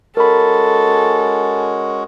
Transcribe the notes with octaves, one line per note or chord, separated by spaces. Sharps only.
G#3 C#4 F#4 A4 A#4 B5